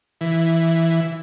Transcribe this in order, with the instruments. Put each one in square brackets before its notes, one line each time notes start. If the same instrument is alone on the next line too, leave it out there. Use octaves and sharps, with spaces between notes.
[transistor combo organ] E3